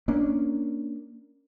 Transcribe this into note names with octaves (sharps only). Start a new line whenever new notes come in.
A#3 C#4 D4